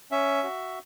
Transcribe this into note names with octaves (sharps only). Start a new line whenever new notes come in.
C#4 E5
F#4